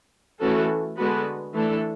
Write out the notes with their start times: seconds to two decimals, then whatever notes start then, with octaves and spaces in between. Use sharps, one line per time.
0.40 E3 A3 C#4 F#4 A4
0.97 D3 G#3 B3 F#4 B4
1.53 E3 A3 D4 A4